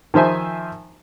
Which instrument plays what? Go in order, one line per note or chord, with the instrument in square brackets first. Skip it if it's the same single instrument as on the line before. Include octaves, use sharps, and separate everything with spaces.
[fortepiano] D#3 F3 C5 E5 G#5